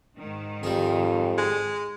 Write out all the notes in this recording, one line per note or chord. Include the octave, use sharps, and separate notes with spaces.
G#2 D#3
F2 G3 G#4
G#3